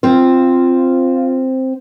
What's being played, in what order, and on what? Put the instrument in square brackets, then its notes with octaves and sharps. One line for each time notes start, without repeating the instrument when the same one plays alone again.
[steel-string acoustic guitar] C4 C5 [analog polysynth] F4